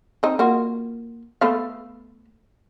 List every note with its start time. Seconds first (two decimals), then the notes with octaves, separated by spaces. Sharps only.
0.23 C4 D#4
0.39 A#3 F4 F#4
1.41 A3 B3 F5